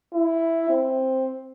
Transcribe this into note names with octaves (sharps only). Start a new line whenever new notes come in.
E4
C4